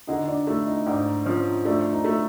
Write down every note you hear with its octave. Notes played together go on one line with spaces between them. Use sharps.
D3 D#4 D#5
D4 D5
A3 E4 E5
D#4 D#5
G#2 D4 D5
F3 C#4 C#5
A3 D4 D5
D#4 D#5
A3